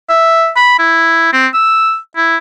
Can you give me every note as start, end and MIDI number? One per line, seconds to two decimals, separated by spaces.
0.09 0.50 76
0.56 0.78 83
0.79 1.28 64
1.33 1.47 60
1.54 1.97 88
2.16 2.37 64